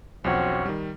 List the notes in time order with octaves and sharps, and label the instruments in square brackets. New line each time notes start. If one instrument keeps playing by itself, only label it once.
[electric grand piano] B1 E2 F3 [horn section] C4 C#4 F#4
[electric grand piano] D#3 G3